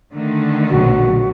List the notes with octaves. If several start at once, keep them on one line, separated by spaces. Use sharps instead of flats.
D3 D#3 A3
A#1 B2 F#3 F#4